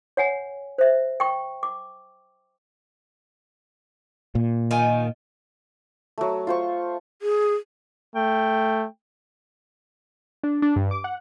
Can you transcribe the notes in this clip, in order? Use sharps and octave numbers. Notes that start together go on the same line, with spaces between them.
C#5 F#5 G#5
C5 E5
G5 C#6
D6
A#2
D#3 F4 G#5
F#3 A3
F4 C5 C#6
G#4
A3 G5
D4
D4
G2
D6
F#5